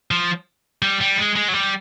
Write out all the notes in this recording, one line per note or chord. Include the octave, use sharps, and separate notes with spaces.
F3
G3
G3
G#3
G#3
F#3
G3